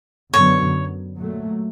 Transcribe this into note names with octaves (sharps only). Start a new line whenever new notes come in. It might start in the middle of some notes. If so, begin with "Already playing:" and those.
F#2 D3 F#3 B3 C#5
A#2 F#3 A3